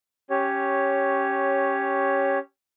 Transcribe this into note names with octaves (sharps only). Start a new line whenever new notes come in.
C#4 G4 C#5